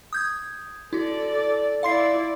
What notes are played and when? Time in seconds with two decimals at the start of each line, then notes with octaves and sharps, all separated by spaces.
0.13 D#6 G6 G#6
0.93 E4 F#4 A4 D5
1.83 E4 D5 F5 C6 C7